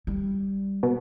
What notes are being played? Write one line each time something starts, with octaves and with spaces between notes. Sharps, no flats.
G3
B2